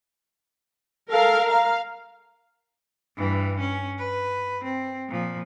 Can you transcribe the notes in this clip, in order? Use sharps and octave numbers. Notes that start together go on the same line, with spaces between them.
A4 A#4 F5
F5 A#5
G2 E3
C#4
B4
C4
A#2 F3